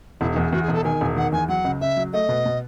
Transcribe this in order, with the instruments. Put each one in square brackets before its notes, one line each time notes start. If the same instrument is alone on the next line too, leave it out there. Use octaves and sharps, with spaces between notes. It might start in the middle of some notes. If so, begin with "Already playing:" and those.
[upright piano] E1 [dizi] E4
[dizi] D#4
[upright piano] E2
[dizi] G#4
[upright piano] E2 [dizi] F#4
[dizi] G#4
[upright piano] E1
[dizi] A4
[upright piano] D#3 [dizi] G#5
[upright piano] E1
[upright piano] D#3 [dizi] F#5
[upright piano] E2 [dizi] G#5
[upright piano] F#3 [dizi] F#5
[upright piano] C#2
[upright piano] C#2 [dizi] E5
[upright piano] F#3
[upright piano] A3 [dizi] D#5
[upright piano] B2
B2